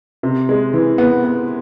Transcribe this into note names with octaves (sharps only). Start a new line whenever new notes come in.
C3
G#3
E3
B3
B3